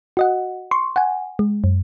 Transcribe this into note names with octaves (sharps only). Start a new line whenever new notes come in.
F#4 D#5 F#5
C6 C#6
F#5 G#5
G#3
F#2